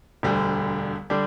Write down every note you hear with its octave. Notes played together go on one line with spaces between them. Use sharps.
E1 D2 D3 G3
D3 G3 D4